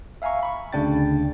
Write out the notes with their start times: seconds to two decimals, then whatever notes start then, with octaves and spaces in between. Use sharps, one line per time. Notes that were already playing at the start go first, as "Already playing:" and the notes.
0.22 E5 F5 G#5 A#5 C#6
0.43 B5 C#6
0.73 D2 C#3 D4 G5 A6